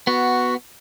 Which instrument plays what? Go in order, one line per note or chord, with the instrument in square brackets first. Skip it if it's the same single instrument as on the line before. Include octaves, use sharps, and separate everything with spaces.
[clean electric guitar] B3 [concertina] F#4